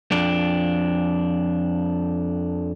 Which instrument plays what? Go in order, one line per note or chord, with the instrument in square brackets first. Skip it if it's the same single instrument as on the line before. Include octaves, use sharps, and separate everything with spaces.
[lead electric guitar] F2 D4